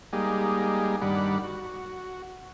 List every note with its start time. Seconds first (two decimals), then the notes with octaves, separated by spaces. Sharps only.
0.13 G3 G#3 A#3 D#4 G4 G#4
1.02 G2 D#3 G3 D5 F#5 B5
1.44 F#4